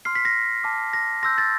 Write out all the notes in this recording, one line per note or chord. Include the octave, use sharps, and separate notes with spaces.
C6 F6 C7
B6
A#6
A5 D6 F6
A#6
C6 E6 G6 A#6
A6